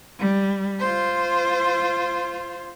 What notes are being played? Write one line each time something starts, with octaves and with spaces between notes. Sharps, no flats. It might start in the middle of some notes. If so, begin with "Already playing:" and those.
G3
F4 C5